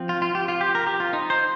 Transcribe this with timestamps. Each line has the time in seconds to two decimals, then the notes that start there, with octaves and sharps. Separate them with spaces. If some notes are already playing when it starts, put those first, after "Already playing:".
Already playing: F3 C4
0.09 F4
0.22 F4
0.35 G4
0.48 F4
0.61 G4
0.75 A#4
0.87 G4
1.00 F4
1.13 D#4
1.30 C5